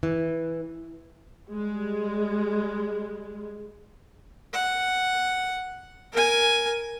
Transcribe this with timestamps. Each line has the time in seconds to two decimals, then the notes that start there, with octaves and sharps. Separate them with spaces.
0.03 E3
1.50 G3 G#3
4.53 F#5
6.12 A#4 G#5